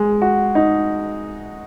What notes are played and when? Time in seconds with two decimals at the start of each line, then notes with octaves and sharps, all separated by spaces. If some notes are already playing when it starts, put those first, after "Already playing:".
Already playing: G#3
0.22 F#4
0.55 D#4